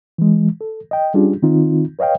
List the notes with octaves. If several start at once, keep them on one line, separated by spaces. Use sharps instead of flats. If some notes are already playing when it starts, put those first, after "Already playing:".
E3 G#3
A4
D#5 G5
G3 C#4 D4 F4 G4 G#4
D#3 C4 D#4 F4
B4 C#5 D#5 F5 G5